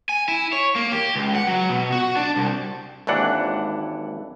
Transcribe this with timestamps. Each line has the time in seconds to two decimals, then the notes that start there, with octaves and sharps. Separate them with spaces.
0.09 G#5
0.28 E4
0.53 C#5
0.76 A#3
0.92 G4
1.15 C#2
1.35 F#5
1.47 F#3
1.69 B2
1.92 F#4
2.16 D4
2.36 C2
3.07 G#1 D#2 E3 D4 F#5